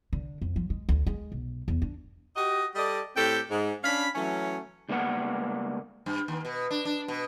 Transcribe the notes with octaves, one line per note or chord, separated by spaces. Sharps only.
D3
F2
F3
G#3
D2
G#3
B1
E2
D4
F#4 G4 D#5
G3 A4 D5 D#5
A2 C4 G4 A4 G5
G#2
C#4 D4 F5 B5
E3 F#3 A3 C#4
C#2 G3 A#3 B3 A#4 F#5
G2
D#2
B2
D4
D4
B2